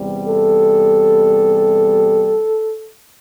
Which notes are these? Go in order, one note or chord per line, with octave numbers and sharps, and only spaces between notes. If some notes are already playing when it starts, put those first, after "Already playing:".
Already playing: E2 C3 G3
A4